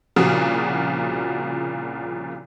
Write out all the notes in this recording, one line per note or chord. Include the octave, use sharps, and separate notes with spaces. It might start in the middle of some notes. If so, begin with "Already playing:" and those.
C2 A#2 C#3 F3 F#4 D#6